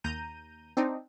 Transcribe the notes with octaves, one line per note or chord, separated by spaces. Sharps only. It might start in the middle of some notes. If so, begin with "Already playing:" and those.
D#2 A#5 G6 D#7
C4 D4 D#4